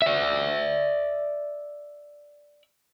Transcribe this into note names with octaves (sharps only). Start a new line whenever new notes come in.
D5 E5